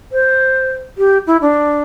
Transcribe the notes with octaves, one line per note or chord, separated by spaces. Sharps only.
C5
G4
E4
D4